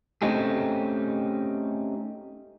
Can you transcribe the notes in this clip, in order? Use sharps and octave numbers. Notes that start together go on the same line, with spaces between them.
A3 C4 C#4 D#4 G4 G#4